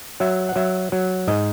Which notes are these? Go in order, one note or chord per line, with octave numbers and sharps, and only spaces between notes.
F#3 E5
F#5
F#3 E5
F#3
G#2 D#5